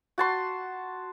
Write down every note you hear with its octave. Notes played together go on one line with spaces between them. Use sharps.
F#4 A5 C6